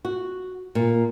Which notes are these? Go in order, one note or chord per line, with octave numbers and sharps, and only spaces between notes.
F#4
A#2